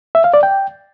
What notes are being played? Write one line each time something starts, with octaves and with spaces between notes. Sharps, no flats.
E5
F5
D5
G5